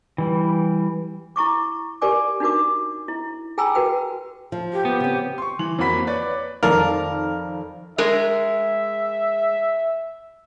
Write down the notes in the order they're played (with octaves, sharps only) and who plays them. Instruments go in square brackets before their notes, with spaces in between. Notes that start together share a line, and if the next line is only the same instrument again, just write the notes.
[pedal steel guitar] E3 G3
[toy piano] E4 A#5 C#6 D6
G4 A#4 D5 G#5 D6
D4 D#4 F#4 A#4 D6
E4
G#4 G5 G#5 A#5 B5 E6
F#4 A#4 B4 G5
[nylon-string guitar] F3
[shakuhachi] G4
[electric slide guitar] B3
[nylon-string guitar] C#3 C4
[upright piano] C6 C#6
E3 F#7
F2 A#3 F#4 B5 B6
B4 C#5 D5
[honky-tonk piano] F2 D#3 [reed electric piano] A4 D5 F5 [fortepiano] A#4
[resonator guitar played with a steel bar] G#3 A#4 [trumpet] E5